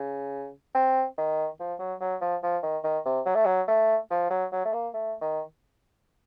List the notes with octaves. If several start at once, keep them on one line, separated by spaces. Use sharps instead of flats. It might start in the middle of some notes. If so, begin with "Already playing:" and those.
Already playing: C#3
C4
D#3
F3
F#3
F#3
F3
F3
D#3
D#3
C3
F#3
A3
F#3
A3
F3
F#3
F#3
A3
A#3
A3
D#3